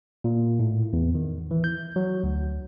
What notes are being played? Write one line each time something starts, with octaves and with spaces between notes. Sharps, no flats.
A#2
A2
E2
D#3
E3
G6
F#3
D2